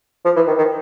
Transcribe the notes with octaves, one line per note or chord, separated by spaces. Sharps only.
F3
E3
D#3
D#3